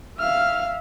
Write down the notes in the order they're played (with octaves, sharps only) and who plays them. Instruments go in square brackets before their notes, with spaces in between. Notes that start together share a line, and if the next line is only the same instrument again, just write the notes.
[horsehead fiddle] E5 F5 [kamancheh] F6